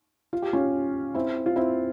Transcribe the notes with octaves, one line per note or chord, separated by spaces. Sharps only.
F4
G4
C#4 F4
C4 E4
F4
C4 E4